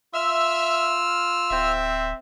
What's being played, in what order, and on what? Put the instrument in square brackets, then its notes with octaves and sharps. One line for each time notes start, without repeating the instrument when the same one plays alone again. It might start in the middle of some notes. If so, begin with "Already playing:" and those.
[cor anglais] F4 [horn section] E5 [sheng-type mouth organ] E6 F6
[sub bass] D1 [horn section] C4 E5